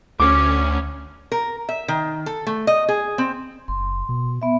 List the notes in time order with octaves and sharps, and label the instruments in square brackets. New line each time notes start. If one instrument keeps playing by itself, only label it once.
[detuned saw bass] D2 [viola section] C#4 [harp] D6 C#7
[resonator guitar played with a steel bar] A#4
E5
D#3
A4
A3
D#5
G#4
C4
[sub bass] F#1 [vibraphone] C6
[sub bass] B2
[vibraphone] B3 E5